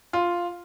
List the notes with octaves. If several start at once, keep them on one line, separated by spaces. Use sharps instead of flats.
F4